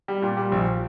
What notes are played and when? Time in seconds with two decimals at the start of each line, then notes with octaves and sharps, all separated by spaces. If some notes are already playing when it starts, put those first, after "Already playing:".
0.08 G3
0.22 A#2
0.37 G3
0.52 A#1